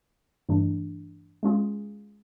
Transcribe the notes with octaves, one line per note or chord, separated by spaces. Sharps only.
G2 E3 A3 D4
G#3 C#4 F4 G#4